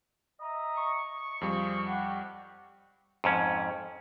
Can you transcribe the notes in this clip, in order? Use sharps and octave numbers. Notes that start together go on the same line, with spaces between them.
D#5 E5 A#5
C#6
F2 G3 G#4 C5 F5
G4 F#5
F2 G#2 C#4